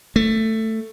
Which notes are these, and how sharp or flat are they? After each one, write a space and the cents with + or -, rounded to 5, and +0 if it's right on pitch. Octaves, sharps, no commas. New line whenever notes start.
A3 +10